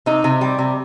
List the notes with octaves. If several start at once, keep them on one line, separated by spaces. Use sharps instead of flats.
C3 D#4
C3
G3
C3